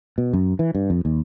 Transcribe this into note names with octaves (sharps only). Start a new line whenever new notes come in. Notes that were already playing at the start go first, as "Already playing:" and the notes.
B2
F#2
E3
G2
F2
D#2